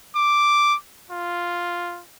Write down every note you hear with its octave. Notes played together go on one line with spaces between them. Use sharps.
D6
F4